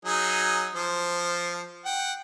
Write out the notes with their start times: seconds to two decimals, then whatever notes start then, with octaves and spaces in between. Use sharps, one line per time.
0.05 F#3 D#4 G#4
0.75 F3 C5
1.86 F#5 G5